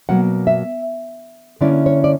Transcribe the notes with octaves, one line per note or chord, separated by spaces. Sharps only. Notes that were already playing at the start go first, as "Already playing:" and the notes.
B2 F#3 A#3 F#5
E5
D3 A#3 C#4 E4 D5
C#5
D5